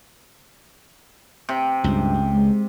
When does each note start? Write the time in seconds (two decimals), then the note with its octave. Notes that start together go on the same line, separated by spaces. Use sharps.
1.49 C3
1.84 C#2 G2
2.33 G#3